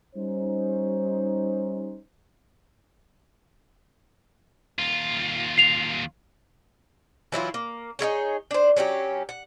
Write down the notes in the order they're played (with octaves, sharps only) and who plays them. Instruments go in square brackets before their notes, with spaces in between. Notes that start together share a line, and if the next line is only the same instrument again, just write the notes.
[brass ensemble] G3 C#4 D#4 C5
[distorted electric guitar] D#2 F4
[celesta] C7 F7
[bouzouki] E3 F#3 E4 F4
A#3
D#4 E4 G#4 C#5
D4 C5
F#3 C#4 D#4 G4
F#5